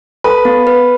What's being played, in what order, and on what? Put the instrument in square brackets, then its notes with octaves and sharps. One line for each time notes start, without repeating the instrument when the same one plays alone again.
[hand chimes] A4 [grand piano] B4
[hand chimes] B3
B4